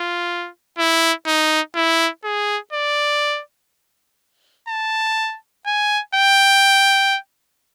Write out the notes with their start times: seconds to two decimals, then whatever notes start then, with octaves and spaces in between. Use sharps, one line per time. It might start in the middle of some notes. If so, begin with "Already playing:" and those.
Already playing: F4
0.79 E4
1.27 D#4
1.75 E4
2.24 G#4
2.73 D5
4.69 A5
5.67 G#5
6.15 G5